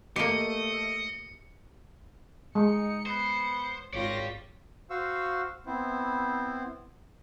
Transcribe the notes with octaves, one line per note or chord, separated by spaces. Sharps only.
A3 A#3 G4 D#5 C#7
G#3 D#4 C#7
B3 C5
G#1 F4 G4 C#5 D5 A#6
F#4 C5 F5 C#6 E6
B3 C4 E4 C5